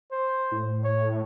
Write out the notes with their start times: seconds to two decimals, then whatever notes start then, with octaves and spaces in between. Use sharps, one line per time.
0.12 C5
0.52 A2
0.84 C#5